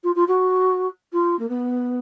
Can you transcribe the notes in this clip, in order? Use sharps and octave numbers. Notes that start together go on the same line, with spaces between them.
F4
F4
F#4
F4
A#3
B3